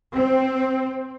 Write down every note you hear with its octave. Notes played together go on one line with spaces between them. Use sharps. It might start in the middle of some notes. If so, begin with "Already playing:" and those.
C4